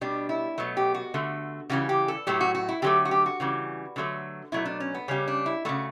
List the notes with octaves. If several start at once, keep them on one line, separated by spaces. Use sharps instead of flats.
B2 G3 D4
E4
B2 F#3 A3
G4
F#4
D3 A3
C#3 E3 G3 F#4
G4
A4
A2 F#3 A3 G4
F#4
F#4
E4
D3 F#3 A3 G4
F#4
G4
F#4
C#3 E3 G3
D3 F#3 A3
B2 F#3 A3 E4
D4
C#4
B3
C#3 G3 C#4
D4
E4
C#3 E3 A3 F#4